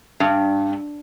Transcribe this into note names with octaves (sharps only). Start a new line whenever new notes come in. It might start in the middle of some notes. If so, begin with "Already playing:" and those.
G2